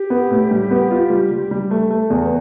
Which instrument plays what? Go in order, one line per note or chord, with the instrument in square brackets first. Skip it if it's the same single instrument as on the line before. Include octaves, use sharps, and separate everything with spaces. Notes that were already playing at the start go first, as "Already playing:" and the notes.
Already playing: [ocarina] G4
[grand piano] B3
A2
G3
B3
F4
G3
G3
G3
A3
A3
E2
[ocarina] B4